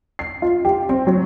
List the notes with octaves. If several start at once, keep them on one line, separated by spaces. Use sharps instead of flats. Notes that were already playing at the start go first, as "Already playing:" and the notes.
C7
F4
G4
C4
F#3